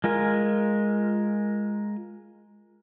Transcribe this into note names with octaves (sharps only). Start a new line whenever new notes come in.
G#3 F4 A#4 G#5